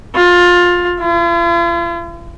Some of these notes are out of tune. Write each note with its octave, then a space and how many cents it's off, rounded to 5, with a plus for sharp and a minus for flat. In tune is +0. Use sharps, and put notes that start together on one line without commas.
F4 +20
F4 -45